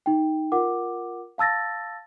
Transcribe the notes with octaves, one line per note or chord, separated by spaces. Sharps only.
D#4 G5
F4 A#4 F#5 D6
F5 A5 E6 A6 A#6